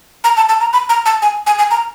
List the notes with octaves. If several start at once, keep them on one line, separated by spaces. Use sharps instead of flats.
A#5
A5
A5
A#5
B5
A#5
A5
G#5
G#5
G#5
A#5